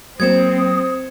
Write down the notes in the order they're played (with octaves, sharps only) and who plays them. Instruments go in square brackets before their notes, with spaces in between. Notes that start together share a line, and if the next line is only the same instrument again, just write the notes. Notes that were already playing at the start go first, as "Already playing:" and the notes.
[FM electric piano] F#3 A#3 C5 [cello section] C4 [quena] D#6 [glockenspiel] G#6 C#7 E7